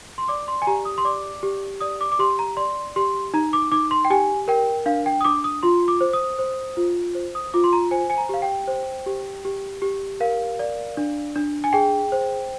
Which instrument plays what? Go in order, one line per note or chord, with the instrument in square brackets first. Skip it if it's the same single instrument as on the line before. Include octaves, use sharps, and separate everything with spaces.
[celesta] C6
D5 D6
C6
G#5
G4 A#5
D#6
C6
D5 D6
G4
D5 D#6
D6
D6
G4 C6
A#5
D5 C6
G4 C6
D#4 A#5
D6
D#4 D6
C6
G5
G4 G#5
A#4 G5
D4 F5
G5
D#6
D4 D6
D#6
F4 C6
D6
C5
D#6
C5
F4
C5
D#6
F4 D6
C6
A#5
C5 G#5
G#5
A#5
G4 F5
G5
C5
G4
G4
G4
A#4 F5
D5
D4
D4
G#5
G#4 G5
C5